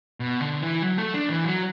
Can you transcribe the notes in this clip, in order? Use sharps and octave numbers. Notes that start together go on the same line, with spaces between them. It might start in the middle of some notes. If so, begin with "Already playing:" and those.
B2
D3
E3
F#3
A3
D4
E3
F#3